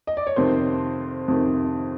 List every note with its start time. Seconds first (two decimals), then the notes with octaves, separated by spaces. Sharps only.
0.07 D#5
0.17 D5
0.27 C#5
0.36 F2 C3 D#3 C5
1.28 F2 C3 D#3